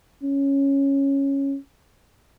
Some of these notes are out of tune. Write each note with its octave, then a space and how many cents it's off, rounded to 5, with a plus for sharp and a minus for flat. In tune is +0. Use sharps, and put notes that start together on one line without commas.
C#4 -5